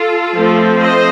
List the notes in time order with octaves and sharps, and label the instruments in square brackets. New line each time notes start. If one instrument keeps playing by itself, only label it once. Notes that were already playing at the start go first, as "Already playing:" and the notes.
Already playing: [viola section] F4 A4
F3 A3 C4
C5 D#5